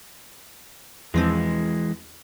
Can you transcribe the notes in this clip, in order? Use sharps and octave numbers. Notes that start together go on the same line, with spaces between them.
E2 E3 F3 G#3 C4